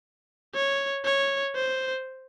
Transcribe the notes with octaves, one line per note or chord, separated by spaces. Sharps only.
C#5
C#5
C5